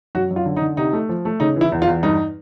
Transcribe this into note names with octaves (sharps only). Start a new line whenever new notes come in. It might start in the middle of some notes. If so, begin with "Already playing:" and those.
F#2 F#4
F#2
F4
D3
D#4
D3
C3 D#4
A3
F3
A3
C#3 D#4
E3 E4
E2
F4
E2
G2 D#4